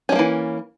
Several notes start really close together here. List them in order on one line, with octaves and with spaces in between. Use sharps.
C#4 G#3 A#3 E3